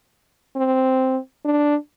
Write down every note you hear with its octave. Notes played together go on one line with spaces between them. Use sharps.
C4
D4